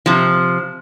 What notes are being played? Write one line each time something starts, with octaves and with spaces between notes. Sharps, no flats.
C3 F3